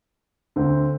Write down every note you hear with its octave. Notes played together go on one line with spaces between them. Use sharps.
D2 D3 C4